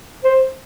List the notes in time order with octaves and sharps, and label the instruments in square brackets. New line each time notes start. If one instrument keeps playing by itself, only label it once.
[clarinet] C5